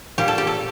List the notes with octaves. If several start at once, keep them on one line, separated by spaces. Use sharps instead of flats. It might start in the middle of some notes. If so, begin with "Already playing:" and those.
A#2 G3 G4
A4
G4
A4